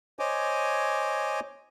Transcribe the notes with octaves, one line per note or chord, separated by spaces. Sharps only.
C5 C#5 D#5 G#5 D6